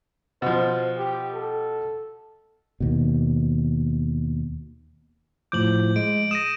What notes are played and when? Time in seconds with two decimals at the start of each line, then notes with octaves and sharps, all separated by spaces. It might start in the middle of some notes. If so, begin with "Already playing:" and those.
0.42 B2 F3 C5
0.97 G4
1.34 A4
2.80 D#2 B2
5.52 A2 F3 D6 G6 F#7
5.96 G#3 D7
6.31 D#6 A#6 D#7 E7